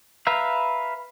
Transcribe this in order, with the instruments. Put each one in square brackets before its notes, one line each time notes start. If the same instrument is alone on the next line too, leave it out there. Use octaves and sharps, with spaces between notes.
[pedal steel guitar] B4 E5 F5 A#5